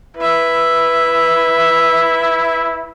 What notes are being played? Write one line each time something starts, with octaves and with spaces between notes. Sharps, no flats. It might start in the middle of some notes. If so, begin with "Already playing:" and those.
E4 B4 E5